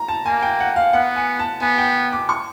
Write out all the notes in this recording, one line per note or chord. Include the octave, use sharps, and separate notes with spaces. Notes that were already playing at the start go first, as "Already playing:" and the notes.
Already playing: A#5
A5
A#3 G#5
G5
F#5
F5
B3 F#5
G#5
A5
B3 G#5
G5
D6
C#6